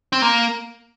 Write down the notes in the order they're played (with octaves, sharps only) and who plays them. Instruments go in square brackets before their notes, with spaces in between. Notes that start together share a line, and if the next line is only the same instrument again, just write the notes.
[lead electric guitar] C4
A#3